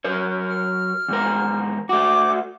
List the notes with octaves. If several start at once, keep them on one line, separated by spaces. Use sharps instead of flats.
F#3 A#4 C#5
F6
E2 G#2 A#4
A3 F#4 D6